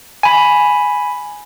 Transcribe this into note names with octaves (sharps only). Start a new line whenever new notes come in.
G#5 B5